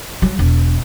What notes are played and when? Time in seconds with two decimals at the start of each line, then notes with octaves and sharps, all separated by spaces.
0.22 F#3
0.39 E1